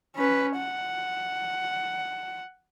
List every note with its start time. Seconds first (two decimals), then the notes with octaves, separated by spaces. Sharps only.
0.16 C#4 B4
0.57 F#5